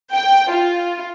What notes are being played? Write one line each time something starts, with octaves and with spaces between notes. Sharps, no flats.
G5
F4